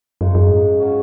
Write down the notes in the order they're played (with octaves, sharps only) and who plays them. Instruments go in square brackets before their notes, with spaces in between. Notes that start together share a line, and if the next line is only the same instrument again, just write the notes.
[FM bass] F#2 [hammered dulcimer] C#3 G#3 D#4
[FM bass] F#2
G#2
[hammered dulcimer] C#3 F#3 C#4 F#4